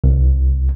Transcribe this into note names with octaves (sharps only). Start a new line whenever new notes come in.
C2